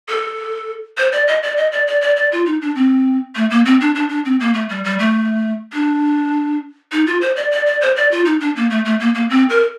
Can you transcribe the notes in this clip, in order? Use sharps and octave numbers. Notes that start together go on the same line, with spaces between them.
A4
C5
D5
D#5
D5
D#5
D5
D5
D5
D5
F4
D#4
D4
C4
A3
A#3
C4
D4
D4
D4
C4
A#3
A3
G3
G3
A3
D4
D#4
F4
C5
D5
D5
D5
C5
D5
F4
D#4
D4
A#3
A3
A3
A#3
A#3
C4
A#4